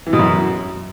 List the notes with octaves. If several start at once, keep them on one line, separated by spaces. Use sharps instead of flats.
E3
B2
F#2